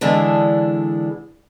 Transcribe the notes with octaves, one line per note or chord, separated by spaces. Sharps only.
D3 E3 G#3 D4